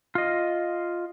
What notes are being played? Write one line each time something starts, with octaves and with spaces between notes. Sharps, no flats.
F4 D#5